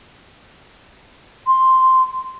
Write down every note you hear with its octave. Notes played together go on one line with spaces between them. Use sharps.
C6